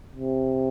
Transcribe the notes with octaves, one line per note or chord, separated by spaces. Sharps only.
C3